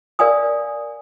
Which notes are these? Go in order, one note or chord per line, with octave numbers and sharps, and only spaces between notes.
A#4 D5 F5 G#5 D#6